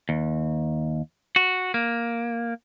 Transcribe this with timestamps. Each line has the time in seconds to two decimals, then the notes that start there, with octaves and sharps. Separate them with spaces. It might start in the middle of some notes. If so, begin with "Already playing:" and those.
0.09 D#2
1.36 F#4
1.74 A#3